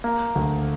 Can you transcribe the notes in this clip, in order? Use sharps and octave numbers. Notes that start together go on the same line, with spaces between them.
A#3
D2